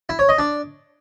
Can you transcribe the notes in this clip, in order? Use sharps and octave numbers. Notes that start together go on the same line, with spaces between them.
E4
C#5
D#5
D4